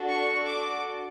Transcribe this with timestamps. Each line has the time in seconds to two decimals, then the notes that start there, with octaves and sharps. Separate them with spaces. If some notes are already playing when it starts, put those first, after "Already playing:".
Already playing: D4 F#4 A4
0.09 C#6
0.46 D6